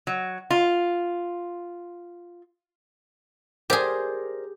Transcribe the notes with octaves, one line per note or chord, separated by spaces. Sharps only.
F#3
F4
G4 G#4 A#4 C5 D5